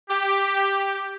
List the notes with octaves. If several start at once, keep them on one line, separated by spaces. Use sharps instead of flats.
G4